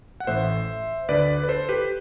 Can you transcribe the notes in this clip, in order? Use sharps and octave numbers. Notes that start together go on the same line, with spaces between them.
F#5
A1 A2 E3 C5 E5
D2 D3 B4 D5
B4
A4 C5
G4 B4